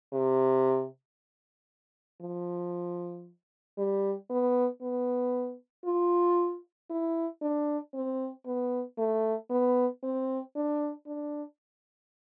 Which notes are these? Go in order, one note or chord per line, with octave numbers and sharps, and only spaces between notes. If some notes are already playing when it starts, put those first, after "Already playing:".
C3
F3
G3
B3
B3
F4
E4
D4
C4
B3
A3
B3
C4
D4
D4